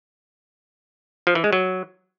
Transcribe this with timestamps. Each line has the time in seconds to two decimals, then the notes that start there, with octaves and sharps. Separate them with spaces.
1.27 F3
1.35 E3
1.44 G#3
1.53 F#3